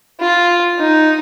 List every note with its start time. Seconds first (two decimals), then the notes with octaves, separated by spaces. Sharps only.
0.20 F4
0.79 D#4